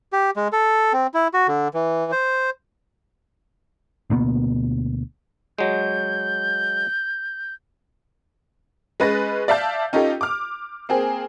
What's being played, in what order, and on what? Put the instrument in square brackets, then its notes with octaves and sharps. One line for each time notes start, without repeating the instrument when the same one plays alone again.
[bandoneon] G4
G#3
A4
C4
E4
F#4
D3
E3
C5
[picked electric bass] D2 B2 A#3 B3
[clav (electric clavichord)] F#3 G#3 [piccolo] G6
[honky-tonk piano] G#3 C#4 B4 A6 A#6
D5 E5 F5 A5 G6
C#4 D#4 F4 G4 A4
D6 F6
A#3 C4 G#4